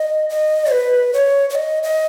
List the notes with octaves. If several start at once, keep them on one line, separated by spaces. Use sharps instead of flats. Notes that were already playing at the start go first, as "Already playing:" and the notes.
Already playing: D#5
D#5
B4
C#5
C#5
D#5
D#5